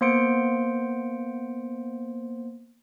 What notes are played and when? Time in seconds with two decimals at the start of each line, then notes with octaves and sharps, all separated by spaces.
0.01 A#3 B3 C5 C6 C#7 D7